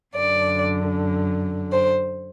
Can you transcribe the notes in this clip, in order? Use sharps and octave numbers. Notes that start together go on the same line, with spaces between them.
F#2 D3 D5
C5